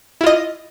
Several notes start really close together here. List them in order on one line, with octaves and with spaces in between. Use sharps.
E4 F4 D#5